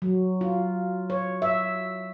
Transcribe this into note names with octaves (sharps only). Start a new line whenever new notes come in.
F#3
F4
C#5
E5